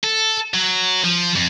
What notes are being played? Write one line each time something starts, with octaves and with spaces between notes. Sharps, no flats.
A4
F#3
F3
F2